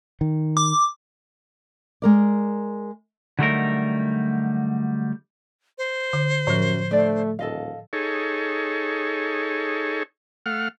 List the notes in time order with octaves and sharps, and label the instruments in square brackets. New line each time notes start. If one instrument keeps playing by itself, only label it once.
[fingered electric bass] D#3
[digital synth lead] D6
[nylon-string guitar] G#3 A#4 D5
[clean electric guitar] D3 F#3 G3 A3 D#4 A#4
[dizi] C5
[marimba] D3
[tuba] F#2 [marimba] A2 F3 [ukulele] A#4 C#5
[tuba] A3 [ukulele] D4 D5
[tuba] D#1 [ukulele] A4 D#5 F5
[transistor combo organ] D#4 G#4 A4 C#5
A3 F5 F#5 F6